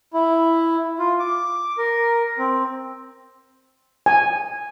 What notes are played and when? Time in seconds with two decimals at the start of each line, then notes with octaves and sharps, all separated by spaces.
0.14 E4
0.99 F4
1.20 D6
1.78 A#4
2.39 C4
4.06 G#5